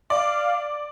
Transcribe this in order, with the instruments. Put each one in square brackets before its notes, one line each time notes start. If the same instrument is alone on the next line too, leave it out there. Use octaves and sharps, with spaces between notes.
[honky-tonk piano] D5 [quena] F5